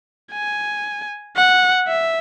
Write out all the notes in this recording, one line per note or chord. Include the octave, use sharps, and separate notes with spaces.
G#5
F#5
E5